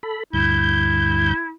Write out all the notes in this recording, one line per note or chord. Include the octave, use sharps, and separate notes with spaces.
A4 B5
D2 G2 E4 G6